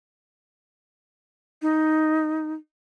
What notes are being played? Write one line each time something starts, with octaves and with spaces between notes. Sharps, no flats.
D#4